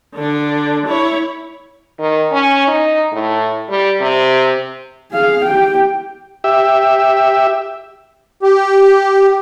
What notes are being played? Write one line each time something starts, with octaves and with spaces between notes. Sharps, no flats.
D3 D4
E4 C#5
D#3
C#4
D#4
A2
G3
C3
G#4 F5
G4 G5
G4 E5
G4